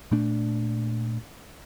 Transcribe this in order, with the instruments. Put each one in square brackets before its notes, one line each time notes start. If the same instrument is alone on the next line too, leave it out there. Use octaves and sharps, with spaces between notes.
[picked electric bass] A#2 A3 D4